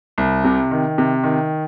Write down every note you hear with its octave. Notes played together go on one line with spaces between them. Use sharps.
C2
C3
D#3
C3
D#3